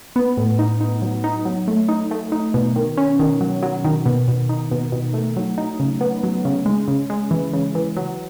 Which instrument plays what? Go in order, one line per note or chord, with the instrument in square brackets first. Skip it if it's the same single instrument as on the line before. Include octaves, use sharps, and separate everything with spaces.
[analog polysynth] B3
A2
D#4
D#4
F#3
D#4
F#3
A3
D#4
A3
D#4
B2
D#3
C#4
D#3
F#3
F#3
D#3
B2
B2
D#4
B2
B2
A3
F#3
D#4
C#3
B3
F#3
C#3
G#3
C#3
G#3
E3
C#3
E3
F#3